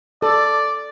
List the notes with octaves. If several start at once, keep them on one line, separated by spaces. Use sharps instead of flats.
A4 D5